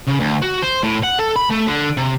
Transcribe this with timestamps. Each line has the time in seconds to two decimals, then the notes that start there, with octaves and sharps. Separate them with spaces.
0.07 C#3
0.20 D2
0.42 F#4
0.62 C5
0.83 A2
1.03 F#5
1.19 A4
1.36 B5
1.50 A3
1.67 D3
1.97 C3